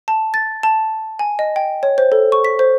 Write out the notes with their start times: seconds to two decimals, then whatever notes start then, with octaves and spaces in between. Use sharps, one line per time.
0.08 A5
0.34 A6
0.63 A5
1.19 G#5
1.39 D#5
1.56 G5
1.83 C#5
1.98 C5
2.12 A4
2.32 C#6
2.45 B6
2.59 C5